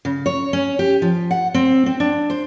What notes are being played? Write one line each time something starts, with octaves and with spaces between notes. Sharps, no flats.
C#3
C#5
C#4
G4
F3
F#5
C4
C4
D4
C5